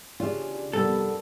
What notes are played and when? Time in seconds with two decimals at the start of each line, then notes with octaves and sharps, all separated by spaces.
0.20 C#3 E3 C#4 D4 F4 G4 G#4
0.73 F1 G2 G3 B3 A4 A#4